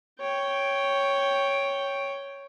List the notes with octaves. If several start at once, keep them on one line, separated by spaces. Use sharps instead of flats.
C#5 G5